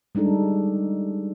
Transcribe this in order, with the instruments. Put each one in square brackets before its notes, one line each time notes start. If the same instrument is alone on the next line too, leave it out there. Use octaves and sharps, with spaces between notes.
[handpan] G3 G#3 D4 D#4 A4